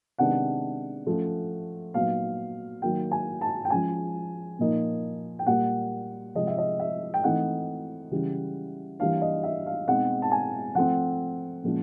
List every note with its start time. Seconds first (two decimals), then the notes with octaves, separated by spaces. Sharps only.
0.18 C3 D#3 G#3 B3 D4 F#5
1.07 F3 A3 C#4
1.94 A#2 F#3 B3 D#4 F5
2.82 D#3 F#3 A#3 G5
3.11 G#5
3.41 A5
3.65 G5
3.70 F3 G#3 C#4 G#5
4.59 A#2 F3 A#3 D#4
5.39 G5
5.46 A#2 G3 A#3 F#5
6.35 C3 F3 G#3 C4 D#5
6.47 E5
6.58 D#5
6.80 E5
7.14 G5
7.23 E3 A3 C4 D#4 F#5
8.11 C#3 E3 G3
9.00 E3 G3 A#3 D4 F5
9.21 D#5
9.43 E5
9.66 F5
9.88 B2 G#3 C4 D#4 F#5
10.22 A5
10.31 G#5
10.75 F3 A3 C4 F#5
11.64 A#2 F3 G#3 C#4